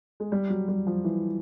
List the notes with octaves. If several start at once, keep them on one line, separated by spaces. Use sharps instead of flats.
G#3
G3
F#3
G3
F3
E3